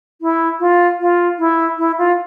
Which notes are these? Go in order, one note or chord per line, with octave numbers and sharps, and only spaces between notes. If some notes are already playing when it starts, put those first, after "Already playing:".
E4
F4
F4
E4
E4
F4